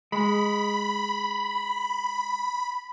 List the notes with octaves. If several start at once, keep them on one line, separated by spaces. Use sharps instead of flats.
G#3 B5